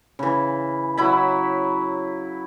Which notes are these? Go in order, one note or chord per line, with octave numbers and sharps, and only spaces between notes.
C#3 E3
F#3 E4 B5